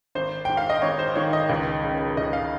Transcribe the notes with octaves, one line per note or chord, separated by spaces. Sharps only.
G#1 C5
G#2 G5
F5
D#5
G#1 C#5
C5
D#3 C#5
D#5
C#2
C#3
C#2 D#5
F5